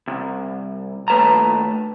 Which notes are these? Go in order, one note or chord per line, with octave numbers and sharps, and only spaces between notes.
C2
D#2 A3 B4 A5 A#5